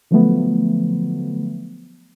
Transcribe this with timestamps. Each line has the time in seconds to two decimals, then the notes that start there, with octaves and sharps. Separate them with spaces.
0.11 D3 F3 F#3 A3 B3